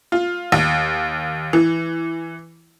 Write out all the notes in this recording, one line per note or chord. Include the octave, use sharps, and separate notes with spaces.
F4
D#2
E3